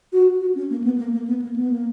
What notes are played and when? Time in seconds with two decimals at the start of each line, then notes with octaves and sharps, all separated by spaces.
0.13 F#4
0.41 F#4
0.55 C#4
0.70 A#3
0.84 B3
0.98 A#3
1.13 A#3
1.28 B3
1.42 A#3
1.56 B3
1.70 A#3